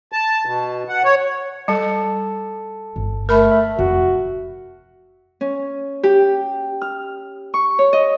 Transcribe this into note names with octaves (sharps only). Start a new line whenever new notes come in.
A5
B2
F#5
C#5
G3 A4 A5 C#7
G1
A3 A#4 B5 F6
E5
F1 F#4
C#4
G4
F6
C#6
C#5
D#5